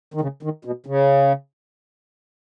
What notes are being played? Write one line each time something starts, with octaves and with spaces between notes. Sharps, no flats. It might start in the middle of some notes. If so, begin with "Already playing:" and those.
D#3
C#3
D#3
B2
C#3